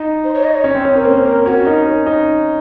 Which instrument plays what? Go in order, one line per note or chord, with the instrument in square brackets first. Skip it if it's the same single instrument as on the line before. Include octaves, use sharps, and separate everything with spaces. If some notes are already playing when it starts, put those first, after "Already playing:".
Already playing: [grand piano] D#4
[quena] C5
C#5
D#5
C#5
[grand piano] C#4
C4
C#4
[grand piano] C#4 [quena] A#4
[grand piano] A#3 [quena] C5
[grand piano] A#3 [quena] A#4
[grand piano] C#4 [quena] F#4
[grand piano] D#4 [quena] A#4
[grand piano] C#4
D#4